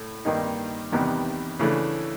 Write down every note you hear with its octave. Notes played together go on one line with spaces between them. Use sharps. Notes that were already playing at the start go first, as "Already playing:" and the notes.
Already playing: A2 A3
G2 D#3 G3 A#3 D#4
E2 C3 D#3 G3 B3
C#3 E3 A3 D4